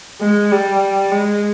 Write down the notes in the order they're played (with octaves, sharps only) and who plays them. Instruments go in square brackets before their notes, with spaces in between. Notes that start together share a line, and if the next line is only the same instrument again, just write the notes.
[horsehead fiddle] G#3
G3
G#3